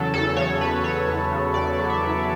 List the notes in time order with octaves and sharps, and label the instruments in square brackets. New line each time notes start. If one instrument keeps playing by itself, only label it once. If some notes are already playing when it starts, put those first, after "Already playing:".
Already playing: [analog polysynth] E2 C#3 F#3 A4
E2 A4
C#3 C#5
E2 B4
F#3 C#5
E2
C#3
E2 D5
F#3
E5
E2